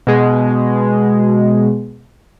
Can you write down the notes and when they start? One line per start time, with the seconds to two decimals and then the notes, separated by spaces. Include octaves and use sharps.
0.07 B2 G#3